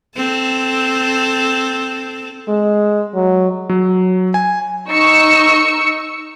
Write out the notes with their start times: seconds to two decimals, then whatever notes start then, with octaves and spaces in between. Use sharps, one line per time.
0.17 C4 A4
2.48 G#3
3.15 F#3
3.69 F#3
4.34 G#5
4.90 D#4 C#6 E6 C#7